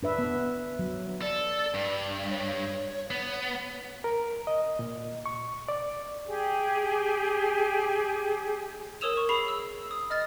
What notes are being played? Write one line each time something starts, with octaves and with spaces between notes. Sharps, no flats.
D4 B4 E5
B3
F#3
A4 D5
G2
C#5
B3
A#4
D#5
A#2
C#6
D5
G4 G#4
A#4 C#5 D#6 E6 E7 F7
C#6
G#4 B5 C7 F7
E6
D#6
D#5 F6 A6